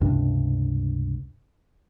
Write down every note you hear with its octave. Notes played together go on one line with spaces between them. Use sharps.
C#2 G2 C3 D4